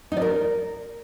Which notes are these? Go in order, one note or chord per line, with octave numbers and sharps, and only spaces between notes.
D#4
D5
A#4